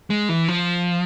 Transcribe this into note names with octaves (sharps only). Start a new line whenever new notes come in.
G#3
E3
F3